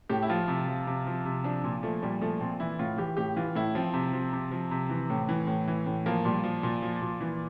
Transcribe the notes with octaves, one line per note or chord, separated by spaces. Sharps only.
A2 G4
E4
F3 F4
C3
F3
C3
F3
C3
F3 D4
A#2
F3 A3
A#2 G3
F3 A3
A#2 C4
E3 E4
A2 F4
E3 G4
A2 G4
E3 F4
A2 E4
F3 C4
C3
F3
C3
F3
C3
E3
A2
E3
A2
E3
A2
F3 A#3
A#2 G3
F3
A#2
F3
A#2
E3